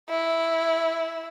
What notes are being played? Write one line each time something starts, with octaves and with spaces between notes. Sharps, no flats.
E4